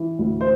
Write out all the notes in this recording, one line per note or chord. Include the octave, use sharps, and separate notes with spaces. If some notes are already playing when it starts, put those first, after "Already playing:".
Already playing: E3
D2
C5